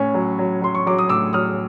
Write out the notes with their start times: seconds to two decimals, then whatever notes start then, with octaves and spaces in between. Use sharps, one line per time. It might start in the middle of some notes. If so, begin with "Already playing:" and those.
Already playing: A2 C#4
0.14 F#3
0.39 F#3
0.62 F#3 C6
0.75 C#6
0.87 F#3 D6
0.99 D#6
1.09 A2 D6 E6
1.33 F#3 D#6 F6